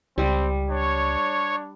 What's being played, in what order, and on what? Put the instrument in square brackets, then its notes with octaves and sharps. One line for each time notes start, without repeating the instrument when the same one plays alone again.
[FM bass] C#2 [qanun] G3 [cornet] C4
[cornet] D4 [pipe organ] C#5